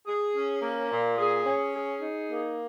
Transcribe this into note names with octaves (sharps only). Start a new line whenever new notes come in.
G#4
C#4
A#3
A#2
G#4
C#4
G#4
D#4
A#3